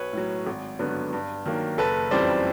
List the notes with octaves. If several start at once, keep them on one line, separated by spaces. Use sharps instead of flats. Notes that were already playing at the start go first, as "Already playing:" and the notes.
Already playing: B1 B4 C#5
A2 F#3
G#1
G2 D3 F#3 B3
G2
D#3 F#3 A#3
F#1 A4 B4
F2 C#3 E3 G3 C5 D5